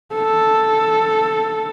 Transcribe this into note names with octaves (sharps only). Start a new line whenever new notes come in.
A4